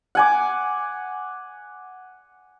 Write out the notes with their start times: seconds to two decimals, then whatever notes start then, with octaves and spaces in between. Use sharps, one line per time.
0.15 F#5 G#5 D6